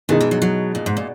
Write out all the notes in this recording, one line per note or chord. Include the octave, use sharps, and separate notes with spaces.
B2 D#3 G#3 D#4
E3
F#3
F#3
A#2
G#2
A#2